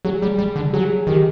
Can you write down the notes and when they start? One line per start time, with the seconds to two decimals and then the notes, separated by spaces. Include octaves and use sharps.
0.05 F#3 G#4
0.22 G3
0.39 G3
0.56 D3
0.73 F#3 G#4
1.07 D#3 G4